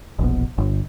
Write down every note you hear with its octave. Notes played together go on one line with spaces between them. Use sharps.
E1 A#1 B2
G1